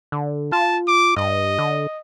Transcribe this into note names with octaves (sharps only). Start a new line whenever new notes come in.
D3
F4 A5
D6
G2 D#5
D3